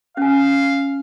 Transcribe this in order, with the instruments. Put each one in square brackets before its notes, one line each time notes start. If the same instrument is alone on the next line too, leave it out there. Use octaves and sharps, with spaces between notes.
[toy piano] C#4 G#5 [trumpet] F5